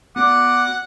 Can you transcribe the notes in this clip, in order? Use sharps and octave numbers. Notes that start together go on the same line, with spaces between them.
B3 F#4 D5 F#5 D6